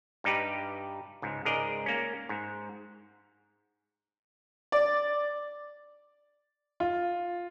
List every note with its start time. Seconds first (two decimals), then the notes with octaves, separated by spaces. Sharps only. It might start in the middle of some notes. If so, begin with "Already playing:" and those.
0.24 G2 G3 D#4 G4 B4
1.22 C#2 G#2
1.45 C#2 G#2 G#4 A#4 D5 D#5
1.86 A#3 C#4
2.29 G#2
4.72 D5
6.80 F4